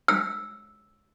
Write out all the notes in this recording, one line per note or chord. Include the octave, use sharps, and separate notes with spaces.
E6